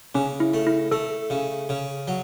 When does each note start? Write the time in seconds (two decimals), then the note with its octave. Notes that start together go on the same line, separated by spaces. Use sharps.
0.15 C#3 C#4
0.40 E4
0.54 A3
0.67 E4
0.91 A3 A4
1.30 C#3
1.69 C#3
2.08 F#3